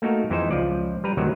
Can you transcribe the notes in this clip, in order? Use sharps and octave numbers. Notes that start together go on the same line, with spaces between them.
A3 A#3 D#4 F#4 A#4
F2 E3 G#3 D#4 C5
C#2 F3 D5
G3 B4 A#5
D2 C3 D#3 F#3